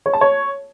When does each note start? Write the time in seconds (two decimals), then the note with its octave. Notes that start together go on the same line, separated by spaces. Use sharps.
0.06 C#5
0.13 A5
0.21 C#5